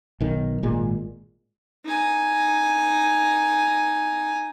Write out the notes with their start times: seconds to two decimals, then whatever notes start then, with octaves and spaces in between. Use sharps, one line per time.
0.21 B1 D#3
0.63 G#1 A#2 G#3
1.85 D#4 G#5